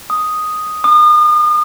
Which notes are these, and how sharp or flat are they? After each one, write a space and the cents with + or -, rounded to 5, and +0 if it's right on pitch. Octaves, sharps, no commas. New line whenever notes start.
D#6 +0
D#6 -40